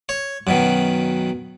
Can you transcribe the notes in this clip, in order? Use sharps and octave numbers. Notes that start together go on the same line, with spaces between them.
C#5
F#2 B2 D#3